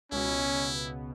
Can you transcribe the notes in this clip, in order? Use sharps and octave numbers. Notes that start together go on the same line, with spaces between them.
C#2 B2 C#4 E4